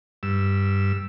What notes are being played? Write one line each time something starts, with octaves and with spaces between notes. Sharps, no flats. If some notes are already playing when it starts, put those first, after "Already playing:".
G2 E6